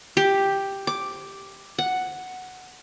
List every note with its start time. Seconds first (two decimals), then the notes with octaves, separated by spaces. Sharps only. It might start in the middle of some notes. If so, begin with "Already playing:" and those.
0.17 G4
0.87 D6
1.78 F#5